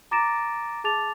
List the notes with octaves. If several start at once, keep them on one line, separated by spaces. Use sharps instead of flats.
A#5 D6 A6 A#6 D7 E7
G#4 A5 D6 A6 F7